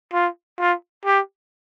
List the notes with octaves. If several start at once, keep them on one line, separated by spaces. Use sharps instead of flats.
F4
F4
G4